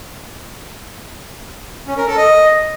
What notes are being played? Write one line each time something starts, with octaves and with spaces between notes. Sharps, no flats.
C#4
A#4
A4
D#5